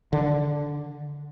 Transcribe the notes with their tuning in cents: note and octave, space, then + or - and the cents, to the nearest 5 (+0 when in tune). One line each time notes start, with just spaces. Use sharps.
D3 -10